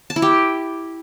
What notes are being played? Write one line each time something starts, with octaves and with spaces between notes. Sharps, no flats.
A5
E4
G4